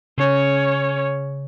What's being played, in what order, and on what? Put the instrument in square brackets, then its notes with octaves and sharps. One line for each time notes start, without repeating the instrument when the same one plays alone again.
[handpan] C#3 [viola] C#4 C#5